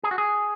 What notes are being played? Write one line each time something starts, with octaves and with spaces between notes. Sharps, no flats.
G#4
F#4
G#4